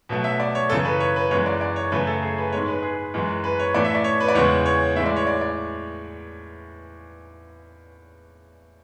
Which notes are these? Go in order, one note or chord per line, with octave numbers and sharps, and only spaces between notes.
B2 F#3 A3
E5
D5
C#5
F#2 C#3 E3 A4
B4
C#5
B4
F#2 E3 G#3 C#5
D5
D5
C#5
F#2 C#3 E3 A3 B4
A4
G#4
B4
G#2 G#3 C#5
B4
G#4
F#2 E3 G#3
B4
C#5
A2 E3 A3 D5
E5
D5
C#5
B4
D5
E2 C#3 E3 G#3 C#5
C#5
A2 E3 G#3 E5
D5
C#5
D5
D5